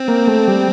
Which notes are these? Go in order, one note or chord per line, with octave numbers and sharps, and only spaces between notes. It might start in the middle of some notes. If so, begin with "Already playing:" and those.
Already playing: C4
A#3
A3
G3